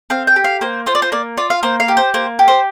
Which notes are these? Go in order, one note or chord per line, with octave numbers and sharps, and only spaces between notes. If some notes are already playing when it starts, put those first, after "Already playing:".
C4 F5
G5
G4
F5
A#3 C5
F4 C5
D5
C5
A#3 D5
F4 D5
F5
A#3 C5
F5
G4
C5
A#3 C5
G4
C5